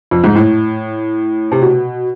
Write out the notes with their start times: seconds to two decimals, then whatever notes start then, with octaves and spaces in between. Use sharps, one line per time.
0.11 F2
0.24 G#2
0.35 A2
1.52 C3
1.62 B2